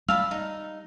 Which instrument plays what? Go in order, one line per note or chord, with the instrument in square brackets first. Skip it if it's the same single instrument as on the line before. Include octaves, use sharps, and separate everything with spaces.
[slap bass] G3 [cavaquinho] F5 A5 B5 [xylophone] E6 F6 F7
[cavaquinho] D#4